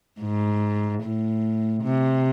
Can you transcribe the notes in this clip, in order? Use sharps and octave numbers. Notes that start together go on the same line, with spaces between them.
G#2
A2
C3